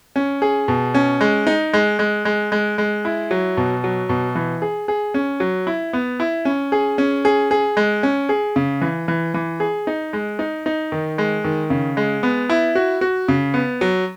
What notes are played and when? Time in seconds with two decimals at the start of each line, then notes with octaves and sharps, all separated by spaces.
0.16 C#4
0.42 G#4
0.68 B2
0.94 C#4
1.21 G#3
1.47 D#4
1.74 G#3
1.99 G#3
2.25 G#3
2.52 G#3
2.78 G#3
3.05 E4
3.31 F#3
3.57 B2
3.84 F#3
4.09 B2
4.35 E3
4.62 G#4
4.88 G#4
5.14 C#4
5.40 F#3
5.67 E4
5.93 B3
6.20 E4
6.45 C#4
6.72 G#4
6.98 C#4
7.25 G#4
7.51 G#4
7.77 G#3
8.03 C#4
8.29 G#4
8.56 C#3
8.81 E3
9.08 E3
9.34 E3
9.60 G#4
9.87 D#4
10.13 G#3
10.39 D#4
10.66 D#4
10.92 D#3
11.18 G#3
11.45 D#3
11.70 C#3
11.97 G#3
12.23 B3
12.50 E4
12.75 F#4
13.01 F#4
13.28 C#3
13.54 B3
13.81 F#3